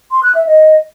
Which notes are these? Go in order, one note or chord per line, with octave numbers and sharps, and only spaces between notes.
C6
F#6
E5
D#5